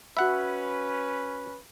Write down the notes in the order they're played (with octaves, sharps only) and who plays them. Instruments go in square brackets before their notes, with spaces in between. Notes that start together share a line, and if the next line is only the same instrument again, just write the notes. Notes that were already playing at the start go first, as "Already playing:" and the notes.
[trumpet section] C#4 B4 [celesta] F#4 B5 [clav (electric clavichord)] E5 F#5